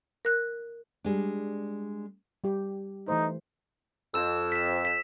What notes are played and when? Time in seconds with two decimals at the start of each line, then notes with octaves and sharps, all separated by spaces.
0.25 A#4 F#6
1.04 G3 G#3 D4
2.44 G3 G4
3.08 E3 A3 D#4 C5
4.14 F2 E6 E7
4.52 B6 E7
4.85 B6 E7